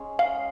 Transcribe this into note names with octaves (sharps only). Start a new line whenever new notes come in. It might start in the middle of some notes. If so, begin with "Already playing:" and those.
Already playing: G#3 C#4 G#4
F5